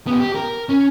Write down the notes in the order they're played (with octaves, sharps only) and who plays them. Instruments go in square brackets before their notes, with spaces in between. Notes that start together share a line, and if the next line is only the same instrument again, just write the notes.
[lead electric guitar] B3 G4
G4
A#4
C#4